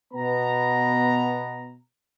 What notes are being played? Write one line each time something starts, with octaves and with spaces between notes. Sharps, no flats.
B2 B3 A#5